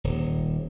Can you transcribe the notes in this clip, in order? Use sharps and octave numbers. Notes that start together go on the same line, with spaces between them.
D#1